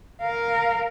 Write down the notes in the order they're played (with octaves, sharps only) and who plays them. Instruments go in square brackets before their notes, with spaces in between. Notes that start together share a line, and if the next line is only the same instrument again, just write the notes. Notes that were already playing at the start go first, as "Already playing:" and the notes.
[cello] A#4 F5